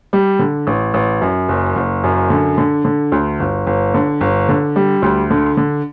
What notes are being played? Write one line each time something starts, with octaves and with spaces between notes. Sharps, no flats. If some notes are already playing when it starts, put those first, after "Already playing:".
G3
D3
A1
A1
F#2
F#1
F#1
F#2
D3
D3
D3
D2
G1
G1
D3
G1
D3
G3
D2
D3
D3